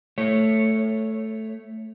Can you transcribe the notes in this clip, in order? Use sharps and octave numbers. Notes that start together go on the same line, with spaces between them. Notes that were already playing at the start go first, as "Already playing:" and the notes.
A3 C#5